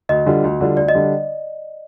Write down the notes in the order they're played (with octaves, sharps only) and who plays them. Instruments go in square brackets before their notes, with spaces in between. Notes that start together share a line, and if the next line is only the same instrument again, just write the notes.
[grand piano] D2 [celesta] D#5
[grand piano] D3 G3 D4 F4
D2
D3 G3 D4 F4
[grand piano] D2 [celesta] D5
[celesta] D#5
[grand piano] D3 G3 D4